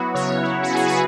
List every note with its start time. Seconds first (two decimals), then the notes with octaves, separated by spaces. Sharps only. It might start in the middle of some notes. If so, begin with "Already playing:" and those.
Already playing: F#3 B3 E4 F#4 B4
0.14 C#3 C#5
0.42 E4
0.63 F#4
0.71 B3 G#4
0.87 B4